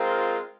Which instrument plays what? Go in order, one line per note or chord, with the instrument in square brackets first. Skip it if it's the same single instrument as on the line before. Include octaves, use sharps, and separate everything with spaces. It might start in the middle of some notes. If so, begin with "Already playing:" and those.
Already playing: [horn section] G#3 C4 F4 A#4